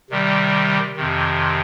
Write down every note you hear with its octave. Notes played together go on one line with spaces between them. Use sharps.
C3 D#3 G3
F2 C3 D#3